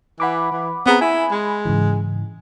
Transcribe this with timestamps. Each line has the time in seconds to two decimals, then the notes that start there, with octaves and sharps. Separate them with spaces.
0.20 E3 F#5 B5 D6
0.52 E3
0.86 B3 C4 G#4 A#5
1.01 E4 G#5 B5
1.31 G#3
1.65 G#2 C#3 E3